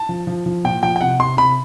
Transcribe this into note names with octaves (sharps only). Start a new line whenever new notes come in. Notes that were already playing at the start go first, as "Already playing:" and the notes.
Already playing: A5
F3
F3
F3
A#2 G5
F3 G5
G5
C3 F#5
C3 C6
C3 B5